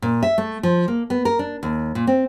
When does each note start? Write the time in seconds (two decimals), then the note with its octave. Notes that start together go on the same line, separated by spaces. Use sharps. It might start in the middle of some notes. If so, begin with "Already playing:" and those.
0.02 A#2
0.23 E5
0.38 A3
0.63 F3
0.88 A#3
1.10 B3
1.25 A#4
1.39 D4
1.63 D#2
1.95 A#2
2.07 C4